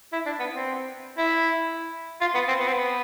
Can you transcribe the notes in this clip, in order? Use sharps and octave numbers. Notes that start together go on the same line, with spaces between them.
E4
D4
B3
C4
E4
F4
B3
C4
B3
C4
B3